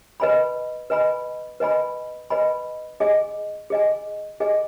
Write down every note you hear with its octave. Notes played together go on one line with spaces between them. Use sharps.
B4 D#5 G#5 B5
B4 D#5 G#5 B5
B4 D#5 G#5 B5
B4 D#5 G#5 B5
G#4 D#5 G#5
G#4 D#5 G#5
G#4 D#5 G#5